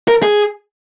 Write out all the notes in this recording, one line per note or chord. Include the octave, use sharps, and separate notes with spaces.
A#4
G#4